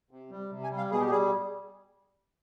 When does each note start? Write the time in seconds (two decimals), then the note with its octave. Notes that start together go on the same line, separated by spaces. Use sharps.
0.11 C3
0.31 G3
0.50 C3
0.64 G#5
0.70 G3
0.77 F5
0.90 B2 G#4
1.01 G4
1.11 G3 G#4